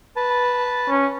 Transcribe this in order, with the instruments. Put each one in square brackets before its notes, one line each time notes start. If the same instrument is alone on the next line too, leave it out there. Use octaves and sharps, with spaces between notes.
[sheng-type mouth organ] B4 A5
[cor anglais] C#4